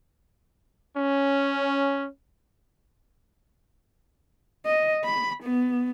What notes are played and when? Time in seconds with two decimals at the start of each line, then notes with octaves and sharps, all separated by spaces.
0.97 C#4
4.66 D#5
5.05 B5
5.43 B3